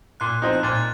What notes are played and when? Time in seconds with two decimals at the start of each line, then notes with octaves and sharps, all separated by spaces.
0.20 A#2 F#6
0.42 F3 C4 D#4
0.53 F#6
0.63 A#2 A6